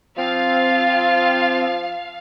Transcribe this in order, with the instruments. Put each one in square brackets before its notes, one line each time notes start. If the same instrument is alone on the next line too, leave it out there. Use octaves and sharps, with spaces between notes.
[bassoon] F3 [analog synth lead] C4 [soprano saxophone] F4 [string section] F5